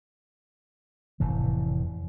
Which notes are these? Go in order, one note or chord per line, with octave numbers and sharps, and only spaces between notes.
F1 A2 E3